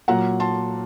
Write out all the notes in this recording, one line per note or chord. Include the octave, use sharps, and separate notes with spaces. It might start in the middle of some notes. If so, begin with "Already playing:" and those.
A#2 F#3 A#3 F#5 A#5
A5 C6